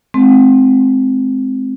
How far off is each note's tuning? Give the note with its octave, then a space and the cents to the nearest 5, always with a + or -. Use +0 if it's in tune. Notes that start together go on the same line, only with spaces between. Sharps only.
G#3 +40 C4 +0